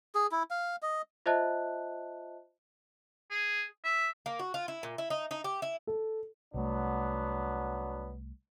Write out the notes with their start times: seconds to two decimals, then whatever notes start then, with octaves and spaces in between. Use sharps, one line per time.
0.15 G#4
0.32 E4
0.50 F5
0.82 D#5
1.26 F4 C5 D#5 E5 A5 F#6
3.31 G#4
3.84 E5
4.26 A#3
4.39 F#4
4.54 F4
4.68 E4
4.83 A#2
4.98 E4
5.10 D#4
5.31 D#4
5.44 G4
5.62 E4
5.87 A4
6.54 C2 F#3 A3 B3 D4